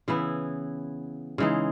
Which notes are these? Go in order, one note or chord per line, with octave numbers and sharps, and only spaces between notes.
C#3 E3 B3 E4
C#3 E3 G#3 D#4